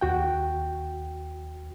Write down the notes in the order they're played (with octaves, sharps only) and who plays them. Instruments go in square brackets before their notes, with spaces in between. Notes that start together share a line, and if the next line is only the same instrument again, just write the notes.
[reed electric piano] D#2 F#4 G5